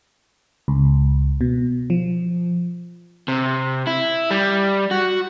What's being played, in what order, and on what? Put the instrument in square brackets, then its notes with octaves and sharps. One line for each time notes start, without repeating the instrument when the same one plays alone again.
[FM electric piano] C#2
B2
F3
[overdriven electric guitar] C3
E4
G3
F#4